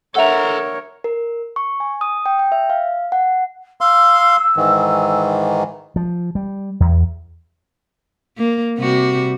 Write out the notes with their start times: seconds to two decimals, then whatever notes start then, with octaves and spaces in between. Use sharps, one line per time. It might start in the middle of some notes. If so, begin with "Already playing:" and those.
0.16 D4 A4 A#4 C#5 E5 F#5 A#5
1.04 A#4
1.56 C#6
1.80 G#5
2.01 D#6
2.26 G5
2.39 G5
2.52 E5
2.70 F5
3.12 F#5
3.81 F5 C6 E6
4.56 G#2 D#3 E3
5.96 F3
6.35 G3
6.80 E2
8.37 A#3
8.78 C3 G3 F#4